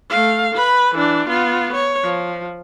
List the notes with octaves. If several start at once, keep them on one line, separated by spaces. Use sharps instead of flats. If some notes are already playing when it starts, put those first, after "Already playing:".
A3 F5
B4 B5
E3 D4
B3 F4
C#5
F3